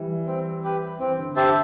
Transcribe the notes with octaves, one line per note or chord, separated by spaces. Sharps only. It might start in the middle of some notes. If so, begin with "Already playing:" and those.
Already playing: E3 G3
C4
G4 B4
E3 C4
D3
D3 G4 C5 E5 A5